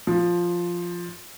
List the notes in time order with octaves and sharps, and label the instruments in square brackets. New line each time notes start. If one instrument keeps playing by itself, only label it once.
[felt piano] F3